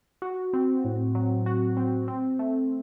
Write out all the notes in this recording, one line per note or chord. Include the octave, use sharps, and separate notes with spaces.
F#4
C4
A2
F#3
F#4
C4
C4
A3